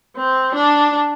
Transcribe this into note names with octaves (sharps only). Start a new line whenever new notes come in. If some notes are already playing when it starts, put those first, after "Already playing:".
C4
D4